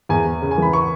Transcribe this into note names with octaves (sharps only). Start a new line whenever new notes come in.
E2 G#5
E2
C#3
G#5
E3 B5
C#6